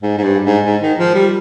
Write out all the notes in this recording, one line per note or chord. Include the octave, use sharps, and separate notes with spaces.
G#2
G#2
G2
G#2
G#2
D#3
F3
G3